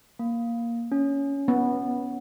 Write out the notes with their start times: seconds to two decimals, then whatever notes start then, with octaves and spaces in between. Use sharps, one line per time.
0.19 A#3
0.92 C#4
1.48 B3